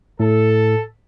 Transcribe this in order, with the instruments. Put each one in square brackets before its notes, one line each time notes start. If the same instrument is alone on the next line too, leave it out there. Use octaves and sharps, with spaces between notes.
[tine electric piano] A2 [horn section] A4